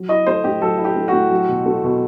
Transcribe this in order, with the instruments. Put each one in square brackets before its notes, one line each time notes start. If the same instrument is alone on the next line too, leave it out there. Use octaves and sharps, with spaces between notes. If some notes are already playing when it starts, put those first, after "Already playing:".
Already playing: [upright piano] F#3
[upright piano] E4 [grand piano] D#5
[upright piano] A3 [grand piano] C5
[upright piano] A2 [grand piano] G4
[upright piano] F#3 [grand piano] A4
[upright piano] E4
[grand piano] G4
[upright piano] A3
[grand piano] F#4
[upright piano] A2
F#3
B2
A3
B2